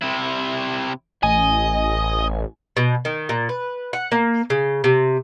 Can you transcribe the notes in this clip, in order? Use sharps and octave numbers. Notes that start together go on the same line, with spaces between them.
C3 E4
A1 D#5 G#5
B2
D#3
A#2
B4
F#5
A#3
C#3
C3